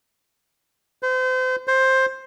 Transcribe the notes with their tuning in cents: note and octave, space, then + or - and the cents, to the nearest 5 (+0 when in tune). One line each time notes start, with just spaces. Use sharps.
C5 -35
C5 +10